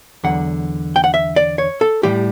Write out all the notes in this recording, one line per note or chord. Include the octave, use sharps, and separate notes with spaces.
E2 D3 F#3 F#5
G5
F#5
E5
D5
C#5
A4
A2 E3 G3 G4